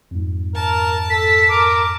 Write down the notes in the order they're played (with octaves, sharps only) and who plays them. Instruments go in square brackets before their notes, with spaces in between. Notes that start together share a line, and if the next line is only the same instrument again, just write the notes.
[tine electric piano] F2 G#2
[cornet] A#4 [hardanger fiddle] A5
[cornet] A4 [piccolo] B6
[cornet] A#4 [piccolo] D6